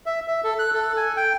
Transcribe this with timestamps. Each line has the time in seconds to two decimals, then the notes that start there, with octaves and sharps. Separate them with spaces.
0.06 E5
0.28 E5
0.44 A4
0.59 F#6
0.74 A4
0.97 G#5
1.17 G5